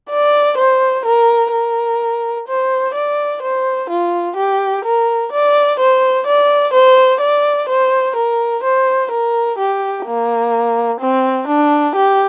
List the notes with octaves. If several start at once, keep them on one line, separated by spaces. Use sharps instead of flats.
D5
C5
A#4
A#4
C5
D5
C5
F4
G4
A#4
D5
C5
D5
C5
D5
C5
A#4
C5
A#4
G4
A#3
C4
D4
G4